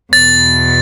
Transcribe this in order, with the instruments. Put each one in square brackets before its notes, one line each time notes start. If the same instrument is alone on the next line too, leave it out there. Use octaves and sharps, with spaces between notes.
[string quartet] E2 B2 [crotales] A6